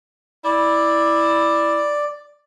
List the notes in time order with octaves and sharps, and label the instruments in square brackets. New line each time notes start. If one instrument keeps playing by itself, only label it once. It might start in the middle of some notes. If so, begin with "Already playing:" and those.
[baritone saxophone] E4 [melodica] D5